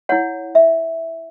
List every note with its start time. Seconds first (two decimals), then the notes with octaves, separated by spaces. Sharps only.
0.09 E4 C#5 F#5
0.55 E5